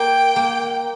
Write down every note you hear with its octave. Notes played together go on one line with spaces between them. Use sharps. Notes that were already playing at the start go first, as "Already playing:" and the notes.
Already playing: A#3 G5
A#3